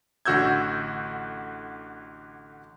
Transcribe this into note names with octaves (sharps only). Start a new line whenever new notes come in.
A1 D3 F#4 E6 G6 G#6